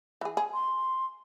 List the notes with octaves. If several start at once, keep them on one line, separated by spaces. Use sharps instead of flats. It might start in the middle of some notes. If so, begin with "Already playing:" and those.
E3 G#4
G#4
C6